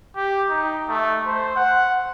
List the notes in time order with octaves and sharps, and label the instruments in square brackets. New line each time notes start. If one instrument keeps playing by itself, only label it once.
[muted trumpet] G4
D#4
A3
C5
F#5